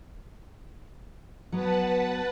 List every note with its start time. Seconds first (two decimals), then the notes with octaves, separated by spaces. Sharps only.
1.52 F#3 B3 B4 F#5 A5